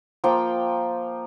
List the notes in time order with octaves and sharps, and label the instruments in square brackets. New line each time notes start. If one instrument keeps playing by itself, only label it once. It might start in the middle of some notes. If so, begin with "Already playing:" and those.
[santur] F3 A#3 G5 C6